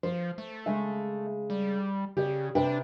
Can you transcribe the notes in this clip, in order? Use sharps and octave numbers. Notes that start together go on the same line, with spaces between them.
F3 C5
A3
C#3 G#3 E5
G3
C#3 G4 D5
C3 D4 B4 G5